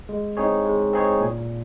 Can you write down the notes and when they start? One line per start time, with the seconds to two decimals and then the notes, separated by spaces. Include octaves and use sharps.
0.09 G#3
0.37 C4 D#4 G#4 C#5
0.65 G#3
0.93 C4 D#4 G#4 C#5
1.21 A#2